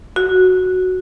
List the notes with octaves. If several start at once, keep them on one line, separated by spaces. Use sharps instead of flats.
F#4